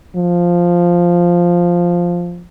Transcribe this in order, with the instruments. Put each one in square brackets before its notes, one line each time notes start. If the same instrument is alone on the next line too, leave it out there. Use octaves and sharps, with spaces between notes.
[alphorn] F3